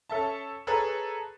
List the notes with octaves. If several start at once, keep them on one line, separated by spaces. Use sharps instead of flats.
C#4 A4 E5 A5
G#4 A4 B4 C#5 A#5